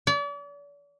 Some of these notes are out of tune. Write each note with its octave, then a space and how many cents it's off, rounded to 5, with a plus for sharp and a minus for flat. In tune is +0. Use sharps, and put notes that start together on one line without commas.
D5 -40